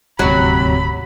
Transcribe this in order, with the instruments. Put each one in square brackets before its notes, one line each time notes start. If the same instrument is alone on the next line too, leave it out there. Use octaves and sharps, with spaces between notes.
[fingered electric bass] D#1 D2 G#2 [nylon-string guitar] C3 F#4 [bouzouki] F#3 [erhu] B5